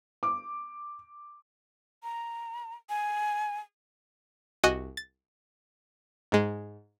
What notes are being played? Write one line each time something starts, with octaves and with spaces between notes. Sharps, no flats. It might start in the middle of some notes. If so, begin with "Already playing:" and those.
D6
A#5
G#5
C2 F#4 D#5 G#5 F#6 C#7
A6
G#2 G#3